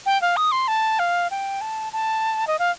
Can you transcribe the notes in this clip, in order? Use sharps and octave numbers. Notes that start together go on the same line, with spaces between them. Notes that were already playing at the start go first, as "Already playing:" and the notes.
G5
F5
D#6
C6
A5
F5
G5
A5
A5
D#5
F5